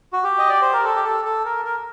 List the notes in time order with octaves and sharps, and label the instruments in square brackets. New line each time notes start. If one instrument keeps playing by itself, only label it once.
[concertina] F#4
G4
D#5
D5
C5
A#4
A4
G4
A4
A4
A#4
A#4